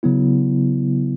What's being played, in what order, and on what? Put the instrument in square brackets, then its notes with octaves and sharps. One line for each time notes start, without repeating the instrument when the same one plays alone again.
[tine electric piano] C#3 F#3 B3 E4